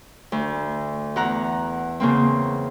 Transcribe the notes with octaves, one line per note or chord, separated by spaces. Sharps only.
D2
E2 F#5 A#5 F#6
C#3 A#3 C4